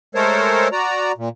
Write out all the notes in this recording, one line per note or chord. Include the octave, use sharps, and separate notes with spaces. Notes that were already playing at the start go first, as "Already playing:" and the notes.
G#3 A3 A4 A#4 C5 C#5
F#4 D5 A#5
A#2